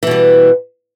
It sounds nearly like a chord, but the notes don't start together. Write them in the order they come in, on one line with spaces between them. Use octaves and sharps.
E3 B2 G3